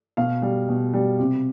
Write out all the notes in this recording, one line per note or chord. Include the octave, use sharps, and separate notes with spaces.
B2 F5
G3
B2
G3
C3